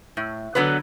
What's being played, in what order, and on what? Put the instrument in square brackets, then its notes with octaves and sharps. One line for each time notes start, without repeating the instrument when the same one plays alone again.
[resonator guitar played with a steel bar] A2
D3 F#3 B3 B4